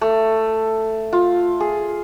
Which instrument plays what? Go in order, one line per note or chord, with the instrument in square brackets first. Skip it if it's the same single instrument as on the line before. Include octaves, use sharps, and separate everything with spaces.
[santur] A3
F4
G#4